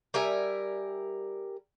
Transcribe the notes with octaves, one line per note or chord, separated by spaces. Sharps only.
G3 A#4 E5 G#5